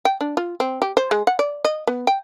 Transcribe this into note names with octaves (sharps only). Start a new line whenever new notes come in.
G5
D4
F4
C4
G4
C5
G#3
F#5
D5
D#5
B3
G5